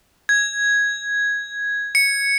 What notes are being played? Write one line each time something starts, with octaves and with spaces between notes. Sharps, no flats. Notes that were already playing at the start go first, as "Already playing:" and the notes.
G#6
C#7